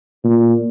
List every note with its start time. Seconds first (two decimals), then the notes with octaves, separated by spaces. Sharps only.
0.24 A#2